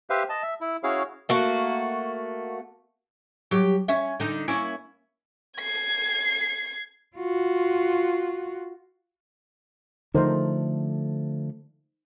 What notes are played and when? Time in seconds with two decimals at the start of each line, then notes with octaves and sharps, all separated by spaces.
0.10 G4 B4 C5 E5 F5
0.29 D#5 A5
0.43 E5
0.61 E4
0.84 C#4 E4 F#4 G#4 C#5 F5
1.29 A3 A#3 F#4
3.51 F#3 G4
3.88 C#4 E5
4.20 D3 D#4
4.48 A#3 C#4 E4
5.58 G#6 C7
7.17 F4 F#4
10.14 D3 F3 A3 D#4 A#4 C5